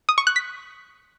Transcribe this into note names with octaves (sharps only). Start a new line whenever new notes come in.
D#6
C#6
F#6
B6